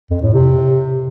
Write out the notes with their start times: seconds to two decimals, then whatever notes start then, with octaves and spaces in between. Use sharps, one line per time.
0.10 F2
0.22 A2
0.34 C3